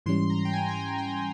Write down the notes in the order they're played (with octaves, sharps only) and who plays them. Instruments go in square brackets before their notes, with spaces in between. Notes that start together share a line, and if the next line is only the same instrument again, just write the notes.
[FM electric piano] G#2 E3 G3 C#4 [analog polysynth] C6
[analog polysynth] A#5
G5
G#5
A#5
G#5
G5